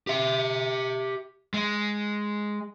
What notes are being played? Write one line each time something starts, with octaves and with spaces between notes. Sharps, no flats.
G4 E5
G#3